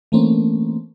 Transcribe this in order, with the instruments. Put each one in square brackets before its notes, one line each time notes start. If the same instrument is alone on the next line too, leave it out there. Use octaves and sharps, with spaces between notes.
[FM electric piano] E3 A3 A#3 C4 C#4